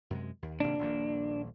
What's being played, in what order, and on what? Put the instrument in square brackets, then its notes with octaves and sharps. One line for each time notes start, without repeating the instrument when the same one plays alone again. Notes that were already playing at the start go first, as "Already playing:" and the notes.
[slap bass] F#2 C3 G#3
D#2
[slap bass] G#1 C3 A#3 [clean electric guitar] D4
[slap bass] D#1 A#1 A#3